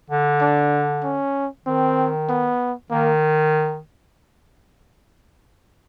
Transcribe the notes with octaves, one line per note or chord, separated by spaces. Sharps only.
D3
D4
C#4
D#3 C4
B3
D#3 A#3